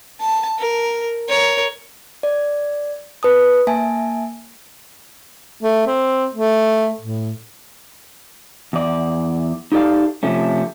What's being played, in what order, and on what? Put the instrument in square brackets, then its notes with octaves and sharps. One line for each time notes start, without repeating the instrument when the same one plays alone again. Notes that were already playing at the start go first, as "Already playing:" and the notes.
[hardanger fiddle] A5
A#4
A#4 C#5
[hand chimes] D5
B4 A5 D#6
A#3 E5 G#5 A5
[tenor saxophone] A3
C4
A3
A2
[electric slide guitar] E2 D5
D#4 G4 A4 D5 F5
C3 F3 A3 C#4